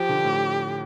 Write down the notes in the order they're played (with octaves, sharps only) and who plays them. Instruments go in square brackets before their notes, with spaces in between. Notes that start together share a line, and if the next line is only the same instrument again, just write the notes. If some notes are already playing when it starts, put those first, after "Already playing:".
Already playing: [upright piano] F3 [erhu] G4
[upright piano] D3
A2